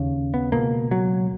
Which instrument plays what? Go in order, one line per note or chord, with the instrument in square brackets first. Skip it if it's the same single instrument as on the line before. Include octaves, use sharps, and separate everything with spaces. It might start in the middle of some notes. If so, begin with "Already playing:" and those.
Already playing: [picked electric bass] D#2 C#3
B3
C#2 B2 A#3
F#3